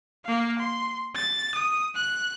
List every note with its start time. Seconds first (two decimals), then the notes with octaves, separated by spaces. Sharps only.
0.25 A#3 F5
0.58 C6
1.15 A6
1.55 D#6
1.95 F#6